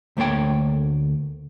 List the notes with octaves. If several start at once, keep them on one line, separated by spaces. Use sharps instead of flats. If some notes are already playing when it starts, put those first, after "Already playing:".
D2 A3 A#3 C#5 G5